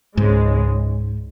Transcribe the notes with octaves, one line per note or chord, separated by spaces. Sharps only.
C#2 G#2 C#3 G#3